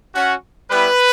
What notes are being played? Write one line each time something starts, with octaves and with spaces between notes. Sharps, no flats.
C#4 F#4
G3 B3 E4 B4